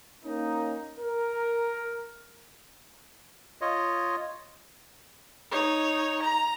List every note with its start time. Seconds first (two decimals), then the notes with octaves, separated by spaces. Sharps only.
0.25 A#3 C#4 D#4
0.98 A#4
3.61 F4 C#5 D#5
5.51 D#4 C#5
6.23 A#5